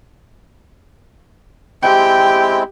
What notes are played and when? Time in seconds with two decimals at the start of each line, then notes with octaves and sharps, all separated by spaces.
1.83 G#3 C4 E4 G4 G5